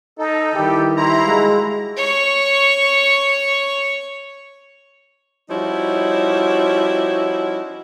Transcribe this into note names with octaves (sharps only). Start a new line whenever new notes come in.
D#4 A4
D#3 E3 G3 G4
E4 A#5 C6
F3 G#3 F#4
C#5 C#6
F3 G3 C#4 D#4 E4 F#4